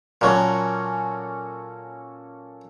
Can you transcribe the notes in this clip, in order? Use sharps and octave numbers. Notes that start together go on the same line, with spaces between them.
A#2 F#3 A#3 C#4 A4